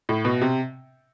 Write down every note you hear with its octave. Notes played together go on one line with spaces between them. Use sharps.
A2
B2
C3